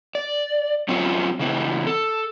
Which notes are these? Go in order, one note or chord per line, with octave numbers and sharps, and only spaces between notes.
D5
F#3 C4 C#4 F4
C#3 E3 C4
A4